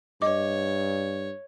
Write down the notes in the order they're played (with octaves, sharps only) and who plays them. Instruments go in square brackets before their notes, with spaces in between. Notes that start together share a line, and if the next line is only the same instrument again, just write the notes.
[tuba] G2 [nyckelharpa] C#5 [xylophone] D#5 D6